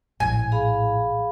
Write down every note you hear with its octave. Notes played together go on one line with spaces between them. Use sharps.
A#1 A2 F3 G#5
G#4 F5 B5